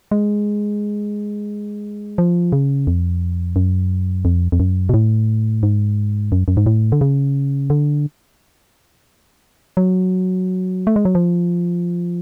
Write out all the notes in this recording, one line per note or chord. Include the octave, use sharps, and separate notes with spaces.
G#3
F3
C#3
F2
F#2
F2
F2
F#2
B2
A2
G#2
F#2
F#2
G#2
A2
D3
C#3
D3
F#3
A3
G#3
F#3
F3